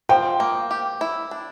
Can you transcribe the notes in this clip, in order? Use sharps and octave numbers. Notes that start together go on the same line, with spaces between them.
F3 G5
A#3
G4
E4
D4